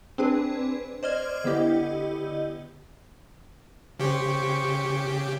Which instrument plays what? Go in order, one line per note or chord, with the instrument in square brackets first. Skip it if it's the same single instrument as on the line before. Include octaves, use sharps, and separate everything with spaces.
[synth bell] C4 D4 G#4 B4
C5 D5 D#5 F6 G#6
D3 B3 E4 G4 D#5
[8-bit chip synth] C#3 G4 [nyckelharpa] C5 C#6